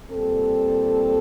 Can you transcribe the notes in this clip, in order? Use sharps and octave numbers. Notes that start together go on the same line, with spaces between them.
A#2 G3 C4 A4